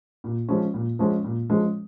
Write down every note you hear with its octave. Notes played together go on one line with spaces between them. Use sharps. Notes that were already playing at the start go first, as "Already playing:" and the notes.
A#2
F3 G#3 C#4
A#2
F3 G#3 C#4
A#2
F3 G#3 C#4